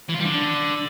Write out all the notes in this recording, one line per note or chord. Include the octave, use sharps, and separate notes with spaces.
E3
F4
G3
D3